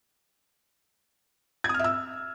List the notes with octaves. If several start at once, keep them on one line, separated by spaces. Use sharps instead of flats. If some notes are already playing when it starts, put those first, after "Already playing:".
G#6
D#6
F6
E5
E6